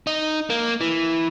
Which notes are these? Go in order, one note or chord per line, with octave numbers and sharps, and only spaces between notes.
D#4
A#3
E3